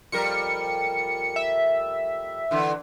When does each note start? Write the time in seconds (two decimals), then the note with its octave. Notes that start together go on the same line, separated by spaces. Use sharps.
0.12 F2 G3 A#4 C#7
1.36 E5
2.51 D3 E3